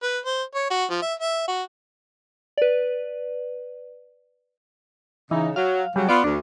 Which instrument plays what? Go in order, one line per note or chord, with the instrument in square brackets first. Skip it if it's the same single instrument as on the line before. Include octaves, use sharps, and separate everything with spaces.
[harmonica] B4
C5
C#5
F#4
F3
E5
E5
F#4
[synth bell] B4 D5
[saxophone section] C#3 D#4 [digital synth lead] E3
[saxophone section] F#3 [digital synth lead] F5
[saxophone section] C#3 F#3 [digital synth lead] G3
[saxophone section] B3 F4 [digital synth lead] D5
[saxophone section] D2 [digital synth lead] D4